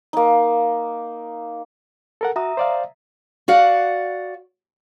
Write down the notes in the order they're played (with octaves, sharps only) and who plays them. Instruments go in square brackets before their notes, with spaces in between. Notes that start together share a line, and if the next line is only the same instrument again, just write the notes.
[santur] A#3 D#4
[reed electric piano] A4 A#4 F#5
[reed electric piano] F#4 [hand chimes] E5 A#5 D#6
[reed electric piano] C5 D5 F5
[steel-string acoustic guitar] F#4 D5 F5 F#5